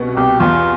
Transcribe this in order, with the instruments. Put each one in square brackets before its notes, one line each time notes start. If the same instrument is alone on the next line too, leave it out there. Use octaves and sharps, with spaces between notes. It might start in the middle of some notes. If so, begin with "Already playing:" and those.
Already playing: [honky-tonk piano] C2 B2 B3
[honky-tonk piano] C2 [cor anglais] G4
[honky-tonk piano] E2 [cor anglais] F4